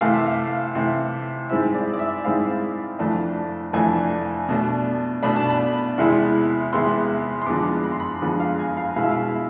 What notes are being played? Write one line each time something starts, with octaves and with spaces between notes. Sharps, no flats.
C3 E3 A3 F5
E5
F5
C3 E3 A3
G#2 G#3 C4 E4 E5
D5
D5
E5
G#2 G#3 C4 E4 F5
F2 E3 A3 D4
F2 E3 A3 D4 G#5
B2 A3 D4
B2 A3 D4 B5
A5
B5
E2 C3 G#3 B3 E4
E2 C3 G#3 B3 E4 C6
C6
F2 D3 G#3 B3 D6
B5
C6
B5
F2 D3 G#3 B3
F5
G#5
F5
B2 G#3 B3 E4 F5
E5
F5